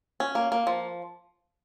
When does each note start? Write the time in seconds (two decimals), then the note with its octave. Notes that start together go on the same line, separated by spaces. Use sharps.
0.20 C#4
0.35 A#3
0.52 A#3
0.67 F3